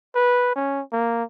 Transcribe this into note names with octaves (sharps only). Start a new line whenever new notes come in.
B4
C#4
A#3